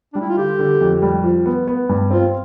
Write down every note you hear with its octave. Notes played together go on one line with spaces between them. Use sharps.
G3 D4
E4
F4
D3 G4
D3
F2
G3
F3
B3
B3
G2
C4 F4